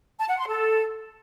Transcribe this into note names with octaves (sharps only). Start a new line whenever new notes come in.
A5
F#5
C6
A4